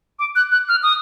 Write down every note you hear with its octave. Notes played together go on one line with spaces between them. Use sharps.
D6
F#6
F#6
F6
D#6